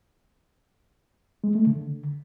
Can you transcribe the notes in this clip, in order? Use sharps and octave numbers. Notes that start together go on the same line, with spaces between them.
G#3
A3
D3